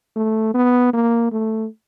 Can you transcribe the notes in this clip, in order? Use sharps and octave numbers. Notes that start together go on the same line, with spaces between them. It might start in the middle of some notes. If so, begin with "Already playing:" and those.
A3
B3
A#3
A3